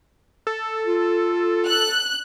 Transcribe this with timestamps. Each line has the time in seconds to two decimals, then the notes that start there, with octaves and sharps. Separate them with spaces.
0.47 A4
0.85 F4
1.67 F#6